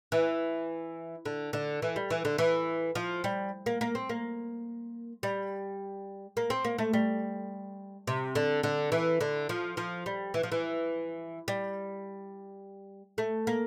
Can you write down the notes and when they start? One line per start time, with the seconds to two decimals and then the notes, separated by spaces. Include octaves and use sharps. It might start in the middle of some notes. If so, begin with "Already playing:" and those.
0.12 E3
1.25 D3
1.53 D3
1.82 E3
1.96 G3
2.10 E3
2.25 D3
2.38 E3
2.95 F3
3.24 G3
3.66 A#3
3.81 A#3
3.95 C4
4.09 A#3
5.23 G3
6.37 A#3
6.50 C4
6.64 A#3
6.78 A3
6.93 G3
8.07 C3
8.35 D3
8.63 D3
8.92 E3
9.21 D3
9.49 F3
9.77 F3
10.06 G3
10.34 E3
10.43 F3
10.52 E3
11.48 G3
13.18 A3
13.47 A#3